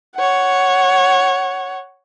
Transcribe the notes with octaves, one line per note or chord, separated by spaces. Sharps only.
C#5 F#5